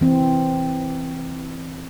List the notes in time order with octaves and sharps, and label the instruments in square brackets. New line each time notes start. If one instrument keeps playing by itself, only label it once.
[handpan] E3 C4